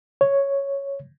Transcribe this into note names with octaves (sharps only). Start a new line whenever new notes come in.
C#5